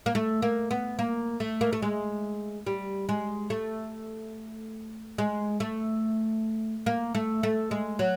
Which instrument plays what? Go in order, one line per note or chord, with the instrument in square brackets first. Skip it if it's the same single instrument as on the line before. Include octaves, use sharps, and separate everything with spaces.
[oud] A#3
A3
A#3
B3
A#3
A3
A#3
A3
G#3
G3
G#3
A3
G#3
A3
A#3
A3
A3
G#3
F#3